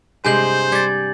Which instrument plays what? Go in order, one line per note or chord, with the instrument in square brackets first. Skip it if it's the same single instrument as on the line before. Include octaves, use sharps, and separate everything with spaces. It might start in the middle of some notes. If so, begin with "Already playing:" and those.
[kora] G2 C3 G#3 [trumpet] C5 [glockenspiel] G#5 G6 F#7
[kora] G3 G4 [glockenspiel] G#6 A6